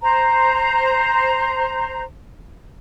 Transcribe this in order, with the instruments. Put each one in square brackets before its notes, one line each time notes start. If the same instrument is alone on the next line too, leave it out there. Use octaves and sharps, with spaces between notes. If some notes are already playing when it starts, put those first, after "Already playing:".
[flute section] C5 A#5